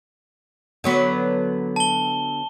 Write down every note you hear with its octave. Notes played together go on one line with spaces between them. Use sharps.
D3 F#3 B3
A5 G7